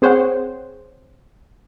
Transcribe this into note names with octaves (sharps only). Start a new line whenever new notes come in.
C4 G#4 C5 C#5 F#5 G5